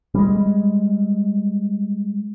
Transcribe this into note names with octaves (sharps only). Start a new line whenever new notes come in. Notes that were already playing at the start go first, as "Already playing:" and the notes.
G3 G#3